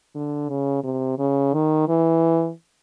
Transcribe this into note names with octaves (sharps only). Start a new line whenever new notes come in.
D3
C#3
C3
C#3
D#3
E3